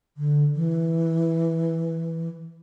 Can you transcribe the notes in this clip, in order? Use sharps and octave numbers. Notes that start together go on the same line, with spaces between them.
D3
E3